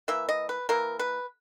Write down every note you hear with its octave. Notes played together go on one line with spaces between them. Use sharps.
E3 A#3 E5
D#5
B4
E3 A#3 A#4
B4